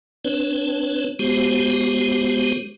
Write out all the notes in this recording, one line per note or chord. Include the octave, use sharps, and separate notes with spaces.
C4 D4 B4 C#5
G#3 B3 F#4 G4 C5